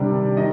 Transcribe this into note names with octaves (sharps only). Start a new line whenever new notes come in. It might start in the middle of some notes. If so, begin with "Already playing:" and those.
Already playing: C3 D#3 G3 D4
D#3 D#5